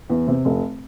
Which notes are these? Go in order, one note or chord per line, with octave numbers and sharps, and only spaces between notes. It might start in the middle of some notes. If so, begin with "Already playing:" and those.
E2
C3
F1